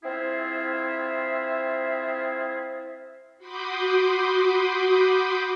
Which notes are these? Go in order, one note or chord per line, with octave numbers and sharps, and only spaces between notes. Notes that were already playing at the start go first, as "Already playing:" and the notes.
C4 E4 F4 G#4 E5
F#4 B5 C6 D6 D#6 G6